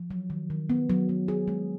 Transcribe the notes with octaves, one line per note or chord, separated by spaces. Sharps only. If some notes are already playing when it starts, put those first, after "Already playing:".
Already playing: F3
F#3
D#3
D#3
B3
F#3
B3
G#4
G#3